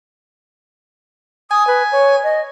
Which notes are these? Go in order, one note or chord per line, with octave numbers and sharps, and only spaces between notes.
G#5 D#6
B4
C#5
D#5